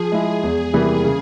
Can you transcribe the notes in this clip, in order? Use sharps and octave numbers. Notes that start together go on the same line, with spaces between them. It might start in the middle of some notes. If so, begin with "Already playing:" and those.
Already playing: F3 G#4
G#3 E4
E2
C3 E3 G3 A#3
C#3